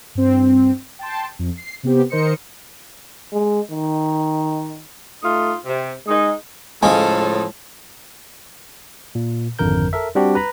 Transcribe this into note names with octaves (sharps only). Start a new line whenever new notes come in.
G2 C4
G5 A5 C6
F2
C7
C3 B3 G4 C5
D#3 A#4 C5 D#5 C#7
G#3
D#3
A3 D#4 F4
C3
G#3 D#4
A2 C#3 F3 G#3 A4 G#5
A#2
G#1 F2 D3 A#4 G6
A4 A#4 E5
G3 C4 D4 F#4 G4
B4 A#5 B5